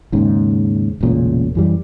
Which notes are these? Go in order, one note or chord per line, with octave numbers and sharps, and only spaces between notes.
D#2 G#2 C#3
E1 A1 A#2 C#3
F#2 E3 G3